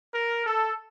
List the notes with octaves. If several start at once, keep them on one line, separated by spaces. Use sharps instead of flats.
A#4
A4